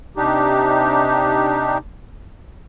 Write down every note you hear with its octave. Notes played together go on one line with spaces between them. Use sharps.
C3 D4 D#4 G4